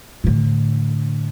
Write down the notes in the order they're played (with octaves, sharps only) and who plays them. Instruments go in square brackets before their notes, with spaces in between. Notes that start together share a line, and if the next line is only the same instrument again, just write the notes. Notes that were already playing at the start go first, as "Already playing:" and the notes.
[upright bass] A2 D3